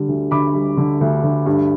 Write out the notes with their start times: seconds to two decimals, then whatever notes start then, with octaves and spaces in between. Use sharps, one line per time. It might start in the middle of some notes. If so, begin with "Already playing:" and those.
Already playing: D3 G3
0.08 D2
0.31 D2 B5 D6
0.54 G3
0.77 D3
1.01 D2
1.23 D2
1.46 G2